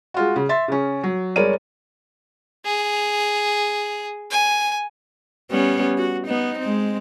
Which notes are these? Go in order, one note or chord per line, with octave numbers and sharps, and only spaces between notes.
G#3 F4 F#4
C#3
E5 C6 A6
C#3 C#4
F#3
G1 G#3 A#4 C#5 D5 D#7
G#4
G#5
G3 B3 C#4
F#4
B3 D#4
G#3 C4